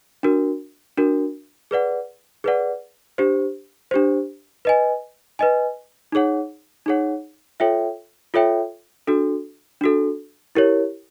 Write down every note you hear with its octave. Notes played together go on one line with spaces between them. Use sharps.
D4 F#4 A#4
D4 F#4 A#4
G#4 B4 D5 F#5
G#4 B4 D5 F#5
D4 G4 C5
D4 G4 C5
B4 D#5 G#5
B4 D#5 G#5
D#4 G#4 C#5 F#5
D#4 G#4 C#5 F#5
F4 A4 C#5 E5 G5
F4 A4 C#5 E5 G5
D4 F#4 A4
D4 F#4 A4
E4 G4 A#4 C#5